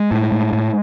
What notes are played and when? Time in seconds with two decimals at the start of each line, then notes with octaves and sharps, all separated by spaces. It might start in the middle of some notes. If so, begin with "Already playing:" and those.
Already playing: G#3
0.11 A2
0.32 A2
0.53 A2